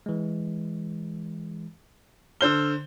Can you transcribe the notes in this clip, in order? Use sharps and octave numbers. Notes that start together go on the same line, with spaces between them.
E3 G#3
D3 C5 E6 F6 G7